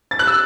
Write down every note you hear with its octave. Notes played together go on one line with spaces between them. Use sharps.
A6
F#6
E6